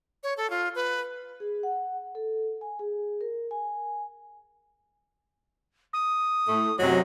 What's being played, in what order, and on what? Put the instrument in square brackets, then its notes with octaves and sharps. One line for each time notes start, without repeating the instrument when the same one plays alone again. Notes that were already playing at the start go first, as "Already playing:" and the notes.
[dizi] C#5
A4
F4
B4
[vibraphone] G#4
F#5
A4
G#5
G#4
A#4
G#5
[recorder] D#6
[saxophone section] A2 A3
[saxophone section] F#2 C3 F#3 [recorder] D#5